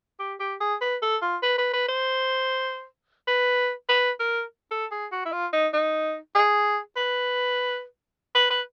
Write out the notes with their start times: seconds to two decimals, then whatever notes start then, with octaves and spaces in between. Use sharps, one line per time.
0.20 G4
0.40 G4
0.61 G#4
0.82 B4
1.02 A4
1.22 F4
1.43 B4
1.58 B4
1.74 B4
1.89 C5
3.28 B4
3.89 B4
4.20 A#4
4.71 A4
4.91 G#4
5.12 F#4
5.26 E4
5.32 F4
5.53 D#4
5.74 D#4
6.35 G#4
6.97 B4
8.35 B4
8.50 B4